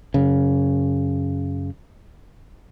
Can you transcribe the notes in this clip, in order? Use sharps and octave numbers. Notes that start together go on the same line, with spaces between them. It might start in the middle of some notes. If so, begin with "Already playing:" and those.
F#2 C#3